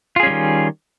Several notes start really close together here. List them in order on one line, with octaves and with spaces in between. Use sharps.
F4 G#4 C#4 G3 D#3